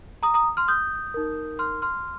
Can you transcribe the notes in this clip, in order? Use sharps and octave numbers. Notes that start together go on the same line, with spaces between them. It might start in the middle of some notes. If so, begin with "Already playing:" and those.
A#5 D#6
A#5 D#6
C6 F6
D#6 G6
D#4 A#4
C6 F6
C6 F6